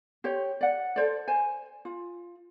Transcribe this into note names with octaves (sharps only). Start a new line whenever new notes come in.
G4 C5 C#5
D5 F#5
A4 C5 D5
C5 G#5
F4